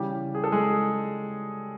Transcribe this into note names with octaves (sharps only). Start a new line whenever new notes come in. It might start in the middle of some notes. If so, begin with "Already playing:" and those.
Already playing: C#3 E3 G3 G4
G#4
A4
G#3 G#4